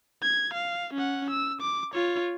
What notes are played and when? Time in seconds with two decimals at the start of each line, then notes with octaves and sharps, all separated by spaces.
0.23 G#6
0.54 F5
0.94 C#4 F#5
1.31 E6
1.62 D6
1.94 F4 C#5